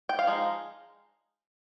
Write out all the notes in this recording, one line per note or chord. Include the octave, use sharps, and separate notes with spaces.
G5
F5
F3 G#3 D#4